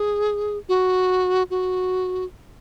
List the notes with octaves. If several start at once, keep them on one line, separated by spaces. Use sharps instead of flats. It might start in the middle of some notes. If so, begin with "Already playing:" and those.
Already playing: G#4
F#4
F#4